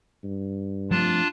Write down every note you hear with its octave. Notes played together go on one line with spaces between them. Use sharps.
G2
F3 A3 C4 D4 F4 A5